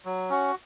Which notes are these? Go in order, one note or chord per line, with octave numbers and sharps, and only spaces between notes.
F#3
C#4 F#4